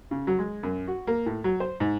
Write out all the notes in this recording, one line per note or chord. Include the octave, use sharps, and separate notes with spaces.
C#3
F#3
G#3
F#2
F#4
A#3
A2
F#3
C5
G#2